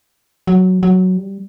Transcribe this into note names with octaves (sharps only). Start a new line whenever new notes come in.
F#3
F#3
G3